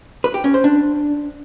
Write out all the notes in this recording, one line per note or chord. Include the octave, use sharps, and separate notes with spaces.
B4
G4
C#4
C5
D4